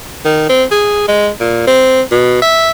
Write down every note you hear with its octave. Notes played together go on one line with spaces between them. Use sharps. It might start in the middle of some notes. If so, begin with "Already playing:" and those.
D#3
C4
G#4
G#3
A#2
C4
B2
E5